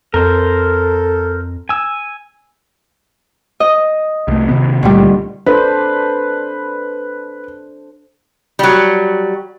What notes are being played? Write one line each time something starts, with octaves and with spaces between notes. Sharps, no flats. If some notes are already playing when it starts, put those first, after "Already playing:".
F2 A4 A#4 C5
G#5 E6
D#5
C2 A3
C3 D#3 B3
C#2 A#2 D3 D#3 G3 A3
D4 A4 B4 C5
F#3 G3